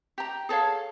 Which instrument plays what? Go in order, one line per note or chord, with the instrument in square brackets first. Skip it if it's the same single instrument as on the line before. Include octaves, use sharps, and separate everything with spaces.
[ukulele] G4 A#5
G#4 A4 C#5 F5